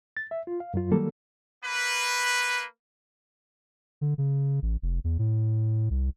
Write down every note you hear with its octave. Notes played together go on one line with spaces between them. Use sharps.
A6
E5
F4
F5
F#2 F#3 F4
D#3 F#3 G3 A#3 A4
A#3 B4
D3
C#3
A1
F1
E2
A2
C2